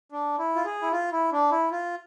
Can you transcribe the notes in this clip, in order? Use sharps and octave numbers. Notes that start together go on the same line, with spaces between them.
D4
E4
F4
G#4
E4
F4
E4
D4
E4
F4